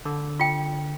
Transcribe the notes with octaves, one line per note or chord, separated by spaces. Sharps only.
D3
F4 G5